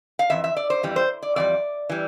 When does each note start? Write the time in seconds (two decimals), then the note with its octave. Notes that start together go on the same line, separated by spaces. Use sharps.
0.19 F5
0.30 F2 E3 E5
0.44 E5
0.57 D5
0.70 C5
0.83 F2 E3 G3
0.96 C5
1.22 D5
1.36 F2 E3 G3 D5
1.89 E3 G3